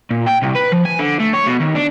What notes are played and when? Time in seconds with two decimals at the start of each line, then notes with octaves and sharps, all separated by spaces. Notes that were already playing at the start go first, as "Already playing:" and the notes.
0.11 A#2
0.27 G5
0.43 C2
0.56 B4
0.73 F3
0.86 G#5
0.99 D3
1.20 A3
1.34 C#5
1.47 B2
1.61 D#2
1.76 D4